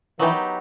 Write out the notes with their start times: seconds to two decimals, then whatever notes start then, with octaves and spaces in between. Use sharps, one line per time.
0.19 E3 F#3 B3 D#4 G4